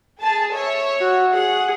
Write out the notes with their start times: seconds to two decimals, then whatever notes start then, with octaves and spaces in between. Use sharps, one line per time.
0.21 G#4 A5
0.53 C#5 E5
1.01 F#4
1.34 G#4 F#5